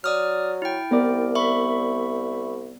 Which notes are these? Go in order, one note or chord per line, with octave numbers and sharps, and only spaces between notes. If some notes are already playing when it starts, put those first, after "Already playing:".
F#3 D5 D#6 F6
E4 G5
C2 B3 A#4 D5
E5 B5 C#6